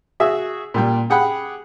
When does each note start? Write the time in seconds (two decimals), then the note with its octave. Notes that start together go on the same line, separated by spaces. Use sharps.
0.20 F#4 G#4 E5
0.74 A#2 G3 G5
1.10 G4 G#4 F#5 G5 B5